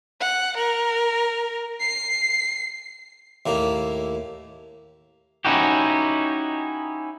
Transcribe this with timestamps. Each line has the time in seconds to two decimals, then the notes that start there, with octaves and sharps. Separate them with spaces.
0.21 F#5
0.57 A#4
1.81 C7
3.46 D#2 A2 A#3
5.45 C#4 D#4 E4 F#4 G4